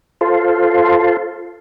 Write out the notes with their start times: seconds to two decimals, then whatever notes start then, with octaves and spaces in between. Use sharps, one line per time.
0.21 F4 A4 C5